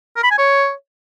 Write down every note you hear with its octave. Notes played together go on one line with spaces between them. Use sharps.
A#4
B5
G#5
C#5